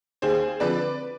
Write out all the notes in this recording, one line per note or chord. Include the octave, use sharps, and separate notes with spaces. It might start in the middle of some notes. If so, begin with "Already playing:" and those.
D#2 G#4 C5
D3 F3 C4 B4 D5